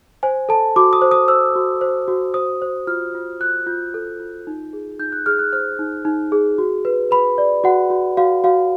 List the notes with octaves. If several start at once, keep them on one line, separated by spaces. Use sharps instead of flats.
C5 G#5
A4 A5
F#4 D6
D#6
C5
D#6
C5 E6
F#4
C5
F#4
C5 D#6
C5
F4 F6
F4
F4 F#6
F4 G6
A4
F4
D#4
G#4
D#4 G6
F#6
G#4 F6
F#6
C5 F6
D#4
D#4
G#4
F#4
B4
B4 B5
D5
F#4 F#5
F#4
F#4 F5
F#4 F5